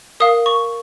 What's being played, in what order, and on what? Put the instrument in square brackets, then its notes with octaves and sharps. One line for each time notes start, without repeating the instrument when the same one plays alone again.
[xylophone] A#4 F5 D#6
C#6